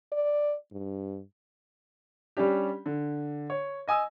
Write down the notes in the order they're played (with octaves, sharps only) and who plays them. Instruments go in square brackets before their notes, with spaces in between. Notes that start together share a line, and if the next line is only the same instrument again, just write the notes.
[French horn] D5
G2
[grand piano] G3 C#4 D4 G4
D3
C#5
D#5 G#5 D#6 E6